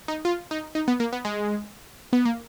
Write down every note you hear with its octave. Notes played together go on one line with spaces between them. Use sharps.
D#4
F4
D#4
D#4
B3
A#3
B3
G#3
B3
A#3